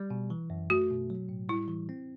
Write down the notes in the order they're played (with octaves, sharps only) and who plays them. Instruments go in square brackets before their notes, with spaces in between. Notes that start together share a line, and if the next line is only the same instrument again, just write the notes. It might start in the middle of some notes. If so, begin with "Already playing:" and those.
Already playing: [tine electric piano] G3
B2
E3
F#2
[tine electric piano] A3 [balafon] F#4
[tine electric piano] B2
F#3
A2
[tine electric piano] G3 [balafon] E4
[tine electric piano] E3
C4